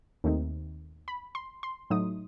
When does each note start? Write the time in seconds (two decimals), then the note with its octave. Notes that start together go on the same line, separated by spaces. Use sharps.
0.24 D#2 D#3 A3 C4 D#4
1.08 B5
1.35 C6
1.63 C6
1.90 A2 F#3 A3 D#4 D#6